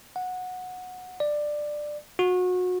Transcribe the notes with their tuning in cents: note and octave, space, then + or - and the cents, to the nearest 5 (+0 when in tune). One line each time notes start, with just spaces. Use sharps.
F#5 -15
D5 +15
F#4 -30